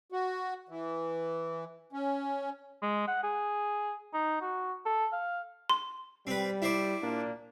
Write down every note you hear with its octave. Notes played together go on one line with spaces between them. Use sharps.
F#4
E3
C#4
G#3
F#5
G#4
D#4
F#4
A4
F5
C6
G3 C4 B4
E4 C5 D5
A#2 A#3 D4